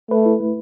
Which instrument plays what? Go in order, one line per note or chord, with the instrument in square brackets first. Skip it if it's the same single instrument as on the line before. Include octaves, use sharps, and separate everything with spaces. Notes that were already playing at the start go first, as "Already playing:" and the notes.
[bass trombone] A3 [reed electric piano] B4
[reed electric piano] E4
A3